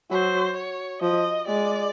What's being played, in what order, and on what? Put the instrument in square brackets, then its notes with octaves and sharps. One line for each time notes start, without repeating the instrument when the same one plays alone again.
[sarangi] F#3 [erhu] C5
[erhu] C#5
[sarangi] F3 [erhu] D#5
[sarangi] G#3 [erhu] D5